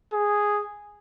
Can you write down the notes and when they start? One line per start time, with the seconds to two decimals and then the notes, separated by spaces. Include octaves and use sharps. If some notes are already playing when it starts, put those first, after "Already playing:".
0.14 G#4